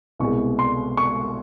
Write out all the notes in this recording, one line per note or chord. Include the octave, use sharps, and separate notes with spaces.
C2 B2 G#3 C#6
C6
C#6